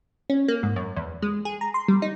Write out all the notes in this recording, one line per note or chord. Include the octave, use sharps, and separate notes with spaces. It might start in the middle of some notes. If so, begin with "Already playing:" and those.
C#4
A#3
G#2
F#2
E2
G#3
G#4
A#5
C6
G3
D#4